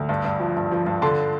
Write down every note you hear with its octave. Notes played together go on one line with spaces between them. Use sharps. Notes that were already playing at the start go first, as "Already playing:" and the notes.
Already playing: D2
G2
G2
F3
G2
F3
G2
D3 A5 C6